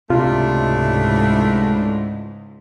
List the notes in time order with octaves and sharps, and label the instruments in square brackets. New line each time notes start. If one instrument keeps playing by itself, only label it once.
[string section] C#2 G#2 [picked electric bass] C3 [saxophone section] A3 D4 E4 [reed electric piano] F4